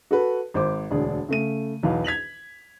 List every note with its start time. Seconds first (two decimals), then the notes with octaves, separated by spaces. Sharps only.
0.11 F#4 A4 B4
0.54 G#1 C5 D6
0.91 E1 D2 D4 G#4
1.29 C#3 A3 D#7
1.83 B1 E2 B4 F5
2.04 G#6 B6 F7 F#7